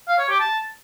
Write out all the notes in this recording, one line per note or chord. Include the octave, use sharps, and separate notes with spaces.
F5
C#5
G4
A5